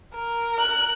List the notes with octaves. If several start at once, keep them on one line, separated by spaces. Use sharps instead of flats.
A#4
F#6